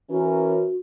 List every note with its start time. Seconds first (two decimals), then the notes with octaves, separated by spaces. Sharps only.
0.10 E3 C#4 F#4 A#4